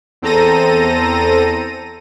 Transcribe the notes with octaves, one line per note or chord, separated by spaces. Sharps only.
E2 C4 A4 A#5 A#6 D#7